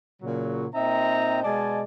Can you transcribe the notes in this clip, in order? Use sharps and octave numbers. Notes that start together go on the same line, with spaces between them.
A#2 C#3 F#3
A#2 C4 D#4 E5 G5 A#5
B2 G#3 D5 D#5 G#5 A5